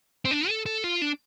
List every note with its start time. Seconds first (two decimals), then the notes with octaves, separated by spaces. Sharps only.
0.25 C4
0.31 D4
0.49 A4
0.66 A4
0.84 F4
1.02 D4